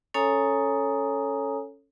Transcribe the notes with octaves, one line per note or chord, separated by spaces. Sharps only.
C#4 A4 C#5 G#5 A#5 D#6